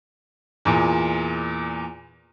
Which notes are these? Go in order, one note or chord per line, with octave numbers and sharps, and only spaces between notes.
E2 A#2